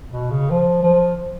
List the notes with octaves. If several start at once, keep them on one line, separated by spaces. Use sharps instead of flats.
B2
C#3
F3
F3